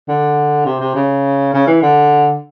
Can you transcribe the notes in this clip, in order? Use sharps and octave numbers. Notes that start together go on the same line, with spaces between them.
D3
C3
C3
C#3
C#3
E3
D3